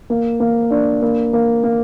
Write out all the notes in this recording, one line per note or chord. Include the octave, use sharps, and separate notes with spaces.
A#3
A#3
D4
A#3
A#3
A#3